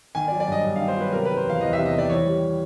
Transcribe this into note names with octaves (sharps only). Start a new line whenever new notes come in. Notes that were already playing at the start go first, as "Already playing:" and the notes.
D#3 G#5
D5
F#3
D5
G2 D#5
G2
D#3 F5
C5
F#3 B4
C3 A#4
D#3 B4
C5
E2 F5
E2 D#5
E5
C3
D#5
D#3 D5
E3 C#5
G3